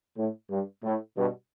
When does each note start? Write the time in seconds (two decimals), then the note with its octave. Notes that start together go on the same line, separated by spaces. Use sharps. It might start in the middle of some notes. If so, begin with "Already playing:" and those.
0.17 A2
0.50 G2
0.83 A2
1.16 G2 B2